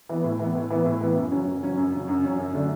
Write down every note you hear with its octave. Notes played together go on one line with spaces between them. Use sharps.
E3 B3
A2
E3 B3
A2
E3 B3
A2
E3 B3
F#2
C#3 F#3 C#4
F#2
C#3 F#3 C#4
F#2
C#3 F#3 C#4
F#2
C#3 F#3 C#4
F#2
D3 F#3 A3 D4